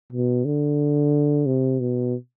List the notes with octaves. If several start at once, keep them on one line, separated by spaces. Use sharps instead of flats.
B2
D3
C3
B2